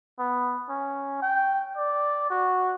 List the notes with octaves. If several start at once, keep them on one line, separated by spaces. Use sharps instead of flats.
B3
C#4
G5
D5
F#4